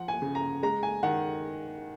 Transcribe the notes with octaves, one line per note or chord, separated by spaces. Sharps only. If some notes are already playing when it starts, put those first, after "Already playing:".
Already playing: F3 F#5
G#5
C#3
A#5
G#3 A#5
G#5
D#3 F#5